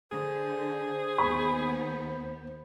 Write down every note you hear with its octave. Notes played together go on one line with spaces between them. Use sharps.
D3 G#4 C5
D#2 B3 B5